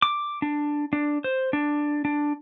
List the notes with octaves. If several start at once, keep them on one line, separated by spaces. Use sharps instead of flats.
D6
D4
D4
C5
D4
D4